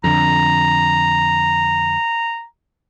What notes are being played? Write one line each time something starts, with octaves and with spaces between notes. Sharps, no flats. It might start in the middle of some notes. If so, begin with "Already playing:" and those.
F2 D3 A#5